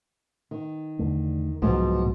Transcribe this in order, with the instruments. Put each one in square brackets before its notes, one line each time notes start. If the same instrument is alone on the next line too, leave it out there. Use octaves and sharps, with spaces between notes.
[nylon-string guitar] D#3
[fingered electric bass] E2 D3 A3
[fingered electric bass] C2 F#3 [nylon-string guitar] G#2 B2 F3